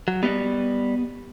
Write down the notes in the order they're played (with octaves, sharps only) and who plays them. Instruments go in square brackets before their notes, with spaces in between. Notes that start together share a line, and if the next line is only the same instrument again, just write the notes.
[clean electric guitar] F#3
[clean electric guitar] G3 [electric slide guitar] B3 D#5